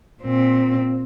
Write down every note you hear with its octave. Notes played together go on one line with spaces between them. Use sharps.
A#2 C4